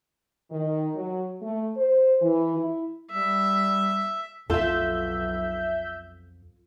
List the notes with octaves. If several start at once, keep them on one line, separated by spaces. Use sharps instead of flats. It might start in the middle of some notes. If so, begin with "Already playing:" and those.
D#3
F#3
A3
C5
E3
E4
G3 E5
B1 F2 F4 A4 E5 G6